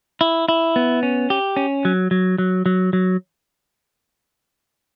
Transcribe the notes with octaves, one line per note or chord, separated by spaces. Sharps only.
E4
E4
B3
C#4
G4
C#4
F#3
F#3
F#3
F#3
F#3